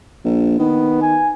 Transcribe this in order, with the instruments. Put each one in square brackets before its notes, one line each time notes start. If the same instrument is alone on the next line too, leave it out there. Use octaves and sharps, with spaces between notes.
[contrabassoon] A#1
[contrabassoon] D#3 [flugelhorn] B3
[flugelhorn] G#5